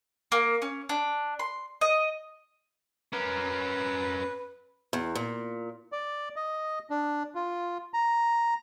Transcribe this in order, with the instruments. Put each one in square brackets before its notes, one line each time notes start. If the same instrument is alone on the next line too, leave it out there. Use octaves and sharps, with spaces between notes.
[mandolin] A#3
C#4
D4
C6
D#5
[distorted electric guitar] C#4 A#4 [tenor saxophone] B4
[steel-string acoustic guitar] E2
A#2
[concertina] D5
D#5
D4
F4
A#5